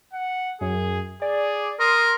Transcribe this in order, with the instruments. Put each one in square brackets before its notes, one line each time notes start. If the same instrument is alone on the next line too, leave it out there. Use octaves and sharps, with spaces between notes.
[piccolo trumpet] F#5
[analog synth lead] F#2 [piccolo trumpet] G#4
[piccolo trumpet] G#4 [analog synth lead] D5
[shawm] A#4 [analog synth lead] C6 [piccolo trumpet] D#6